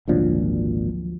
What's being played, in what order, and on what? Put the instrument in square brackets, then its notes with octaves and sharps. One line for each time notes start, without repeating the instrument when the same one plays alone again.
[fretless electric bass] G#1 A#2 D4 [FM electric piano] D2 F3 F#3